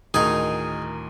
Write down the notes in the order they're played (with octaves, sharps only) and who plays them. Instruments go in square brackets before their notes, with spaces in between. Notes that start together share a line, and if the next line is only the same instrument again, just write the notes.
[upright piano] D2 A2 D#3 [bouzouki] D#4 A#4 [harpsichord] G#4